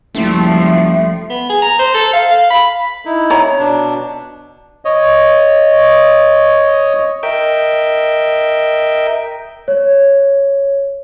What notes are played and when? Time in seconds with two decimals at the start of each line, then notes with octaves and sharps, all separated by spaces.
0.15 F#1 F3 G3 A3
1.30 B3
1.49 G#4
1.62 A#5
1.79 C5
1.94 A4
2.13 F5
2.29 F5
2.50 B5
3.05 D#4 E4
3.30 C#5 A#5
3.59 B2 D4
4.85 C#5 D#5
7.23 A#4 D#5 E5 G5
9.68 C#5